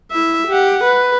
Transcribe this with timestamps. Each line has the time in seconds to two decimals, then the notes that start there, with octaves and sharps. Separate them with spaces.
0.11 E4 E5
0.48 G4 F#5
0.84 B4